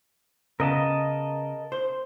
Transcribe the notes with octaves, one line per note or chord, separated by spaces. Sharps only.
C#3 B3 A#4 D#5 A5
C5